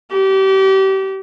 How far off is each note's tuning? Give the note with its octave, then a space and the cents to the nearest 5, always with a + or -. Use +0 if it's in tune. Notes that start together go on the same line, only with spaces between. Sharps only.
G4 -30